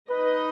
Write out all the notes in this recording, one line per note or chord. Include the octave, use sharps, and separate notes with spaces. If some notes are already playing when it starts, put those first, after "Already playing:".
D#4 B4 D#5